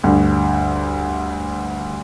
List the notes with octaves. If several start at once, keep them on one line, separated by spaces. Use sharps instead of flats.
D2 G2